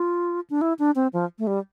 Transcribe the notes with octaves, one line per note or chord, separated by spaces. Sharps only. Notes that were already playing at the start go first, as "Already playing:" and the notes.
Already playing: F4
D4
E4
D4
C4
F3
A3
G3